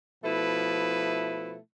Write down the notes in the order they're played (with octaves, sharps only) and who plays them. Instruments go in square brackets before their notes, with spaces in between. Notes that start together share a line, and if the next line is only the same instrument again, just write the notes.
[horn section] B2 F3 A3 E4 B4